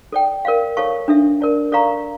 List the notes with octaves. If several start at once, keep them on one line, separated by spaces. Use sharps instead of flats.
A4 D5 G5
A#4 D5 F5
A4 C#5 F5 A5 C#6
D4 A4 E5
A#4 D5 A5
A4 D5 F5 A#5 C#6